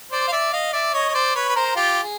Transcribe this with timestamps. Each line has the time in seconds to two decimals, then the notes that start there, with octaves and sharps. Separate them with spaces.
0.12 C5 D5
0.28 F5
0.32 D5 E5
0.53 D#5 F5
0.73 D5 E5
0.93 C#5 D#5
1.09 C#5
1.14 C5 D5
1.35 B4 C#5
1.48 B4
1.56 A#4 C5
1.76 F4 G4
2.03 G#4